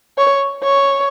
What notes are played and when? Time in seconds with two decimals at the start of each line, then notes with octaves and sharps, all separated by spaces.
0.18 C#5
0.64 C#5